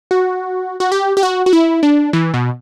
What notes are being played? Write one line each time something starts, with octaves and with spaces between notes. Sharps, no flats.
F#4
F#4
G4
G4
F#4
F#4
E4
D4
E3
B2